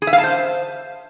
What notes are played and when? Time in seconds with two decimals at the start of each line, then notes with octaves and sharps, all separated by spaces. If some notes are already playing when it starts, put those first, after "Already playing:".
0.02 G#4
0.07 E5
0.13 F5
0.18 A5
0.24 C5